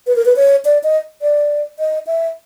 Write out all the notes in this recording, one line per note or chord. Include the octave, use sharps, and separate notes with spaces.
B4
A#4
B4
C#5
D5
D#5
D5
D#5
E5